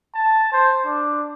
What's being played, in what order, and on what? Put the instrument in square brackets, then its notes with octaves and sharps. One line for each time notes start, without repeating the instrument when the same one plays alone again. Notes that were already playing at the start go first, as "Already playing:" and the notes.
[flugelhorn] A5
C5
D4